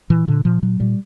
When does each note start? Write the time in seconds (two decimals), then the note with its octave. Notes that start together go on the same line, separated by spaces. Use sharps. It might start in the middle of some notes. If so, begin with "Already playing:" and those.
0.10 A#2 E3
0.28 A#2 D3
0.45 A#2 F3
0.62 A#2 F#3
0.80 A#2 G3